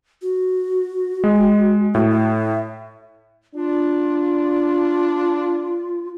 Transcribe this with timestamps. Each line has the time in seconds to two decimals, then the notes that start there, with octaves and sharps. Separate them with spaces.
0.22 F#4
1.24 G#3
1.95 A2 F#4
2.10 E5
3.55 D4 F4